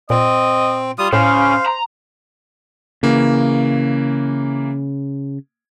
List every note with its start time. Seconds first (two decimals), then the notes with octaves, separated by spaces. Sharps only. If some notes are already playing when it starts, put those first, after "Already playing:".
0.10 A#2 C4 D#5
0.98 G3 F4 D#6
1.13 A2 C#3 C5 F5
1.66 A#5
3.03 C#3 E3 A#3